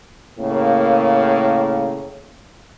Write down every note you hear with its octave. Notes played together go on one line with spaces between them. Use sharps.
A2 C#3 A#3